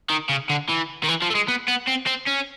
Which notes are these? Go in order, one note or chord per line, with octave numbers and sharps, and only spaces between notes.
D#3
C#3
D3
E3
D#3
E3
F3
A3
G#3
B3
B3
C4
C4
C#4